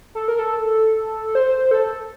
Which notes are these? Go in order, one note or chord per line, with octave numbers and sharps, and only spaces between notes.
A4
A#4
A4
C5
A4